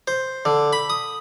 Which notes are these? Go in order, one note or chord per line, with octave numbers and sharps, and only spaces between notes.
C5
D3
B5
D#6